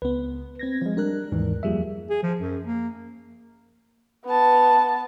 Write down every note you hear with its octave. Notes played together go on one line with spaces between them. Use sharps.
C#2 B3 B4
C4 G#6 A#6
F3 G#3
G3 D4 A#4 F#6
D#2 G#2 E3
F2 F3 G3 A#3 G#4 E5
G#4
F3
F#2
A#3
B3 A5